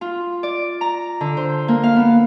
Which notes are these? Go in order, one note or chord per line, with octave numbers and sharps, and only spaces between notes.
F4
D5
A#5
D3
C5
A#3
F5
B3